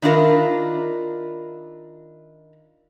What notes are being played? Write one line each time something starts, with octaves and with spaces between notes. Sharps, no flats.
D#3 D4 E4 F4 A#4